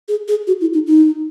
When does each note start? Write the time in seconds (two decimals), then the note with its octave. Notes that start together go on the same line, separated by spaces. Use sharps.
0.08 G#4
0.28 G#4
0.47 F#4
0.61 E4
0.74 D#4
0.87 D#4